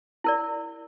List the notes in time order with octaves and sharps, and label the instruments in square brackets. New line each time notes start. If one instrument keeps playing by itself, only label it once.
[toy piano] E4 A#4 D5